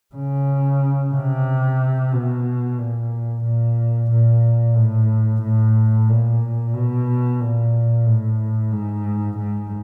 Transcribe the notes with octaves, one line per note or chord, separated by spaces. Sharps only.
C#3
C3
B2
A#2
A#2
A#2
A2
A2
A#2
B2
A#2
A2
G#2
G#2